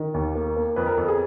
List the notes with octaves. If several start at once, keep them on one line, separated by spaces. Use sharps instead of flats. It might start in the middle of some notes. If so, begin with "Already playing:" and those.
Already playing: D#3
D#2
A#3
A#3
F2 B4
A#4
F2 A4
G#4